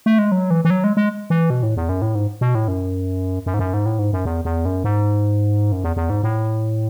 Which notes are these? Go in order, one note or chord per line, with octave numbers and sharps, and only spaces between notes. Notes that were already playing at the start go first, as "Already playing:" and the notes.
A3
G#3
F#3
E3
E3
F#3
G#3
G#3
E3
B2
A2
E2
F#2
A2
G#2
B2
A2
F#2
F#2
G#2
F#2
G#2
A2
G#2
F#2
E2
E2
F#2
G#2
F#2
E2
E2
G#2
A2